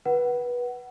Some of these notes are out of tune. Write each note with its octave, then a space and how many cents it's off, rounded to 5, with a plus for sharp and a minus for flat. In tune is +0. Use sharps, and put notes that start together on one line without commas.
B4 -20 F#5 +15